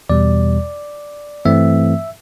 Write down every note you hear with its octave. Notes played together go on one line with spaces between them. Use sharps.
E2 B2 G3 D5
G2 E3 A3 C4 E5